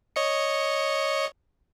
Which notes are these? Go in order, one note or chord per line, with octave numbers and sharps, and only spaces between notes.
C#5 D#5 C#7